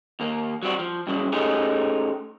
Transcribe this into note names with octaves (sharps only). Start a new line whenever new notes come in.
D#2 A#3
F#3 G3 C4 F#4
F3
G2 C#3 E3 F#3
A3 C#4 D#4 G4 G#4